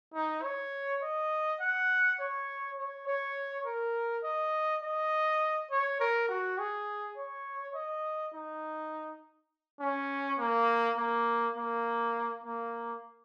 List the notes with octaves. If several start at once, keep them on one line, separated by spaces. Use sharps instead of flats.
D#4
C#5
D#5
F#5
C#5
C#5
C#5
A#4
D#5
D#5
C#5
A#4
F#4
G#4
C#5
D#5
D#4
C#4
A#3
A#3
A#3
A#3